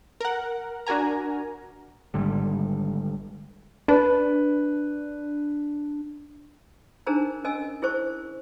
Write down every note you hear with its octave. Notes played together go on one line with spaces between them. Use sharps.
A#4 F#5
D4 F#4 A#4 G#5 A#5
G#1 G#2 D3 G3
D4 B4
D4 D#4 G#4 A#4 C5 A#5
C#4 A#4 D#5 G#5 E6
E4 G#4 A#4 C5 C#6